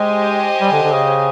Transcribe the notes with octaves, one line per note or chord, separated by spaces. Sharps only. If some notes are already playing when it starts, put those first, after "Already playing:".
Already playing: G#3 G4 C5 D#5 G#5
G3
D3
D3
C#3